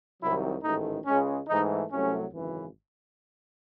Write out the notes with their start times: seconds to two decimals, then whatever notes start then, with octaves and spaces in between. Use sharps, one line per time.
0.22 C2 C3 D#3 F#3 E4
0.63 A1 G#2 D#3 A3 D#4
1.06 C#2 C#3 G#3 C#4
1.48 G#2 E3 A3 D#4
1.91 C2 C3 F#3 A3 C#4
2.32 G#1 F#2 C#3 E3